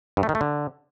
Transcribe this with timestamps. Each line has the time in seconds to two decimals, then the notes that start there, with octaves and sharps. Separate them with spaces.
0.17 G2
0.23 A3
0.29 D#3
0.35 A3
0.41 D3